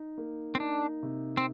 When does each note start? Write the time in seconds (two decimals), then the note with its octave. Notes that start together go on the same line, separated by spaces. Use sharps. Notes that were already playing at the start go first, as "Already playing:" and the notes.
Already playing: D#4
0.18 A#3
0.55 C4
0.60 D4 D#4
1.03 C3
1.37 C4